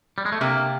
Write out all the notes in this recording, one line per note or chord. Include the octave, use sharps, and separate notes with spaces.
G3
G#3
A3
C3 A#3